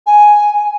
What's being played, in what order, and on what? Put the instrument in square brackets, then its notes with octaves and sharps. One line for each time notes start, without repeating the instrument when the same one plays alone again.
[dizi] G#5